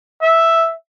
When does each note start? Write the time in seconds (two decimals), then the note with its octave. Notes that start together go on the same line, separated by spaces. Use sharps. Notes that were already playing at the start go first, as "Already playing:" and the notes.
0.23 E5